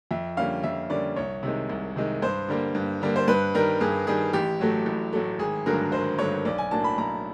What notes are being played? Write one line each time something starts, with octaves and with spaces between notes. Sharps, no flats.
F2 E5
D3 G3 A#3 C#4 F5
F2 E5
D3 G3 A#3 C#4 D5
C2 C#5
C3 D#3 G#3
C2
C3 D#3 G#3
G2 C5
D3 G3 A#3
G2
D3 G3 A#3
C5
G2 B4
D#3 G3 A#4
G2 G#4
D#3 G3 G#4
A1 G4
A2 F#3 A3
A1
A2 F#3 A3
G#1 G#4
G2 D3 F#3 A3 A#4
G#1 C5
G2 D3 F#3 A3 C#5
B1 D5
G#5
A2 F#3 A#3 D4 A5
B5
B1 A#5